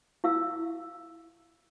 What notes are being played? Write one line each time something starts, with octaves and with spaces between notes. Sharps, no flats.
E4 F5 E6